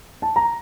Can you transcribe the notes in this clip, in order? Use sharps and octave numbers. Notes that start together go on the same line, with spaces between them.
A5
A#5